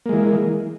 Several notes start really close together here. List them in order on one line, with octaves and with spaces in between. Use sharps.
A#3 G#3 E3